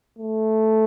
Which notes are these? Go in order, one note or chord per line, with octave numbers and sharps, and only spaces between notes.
A3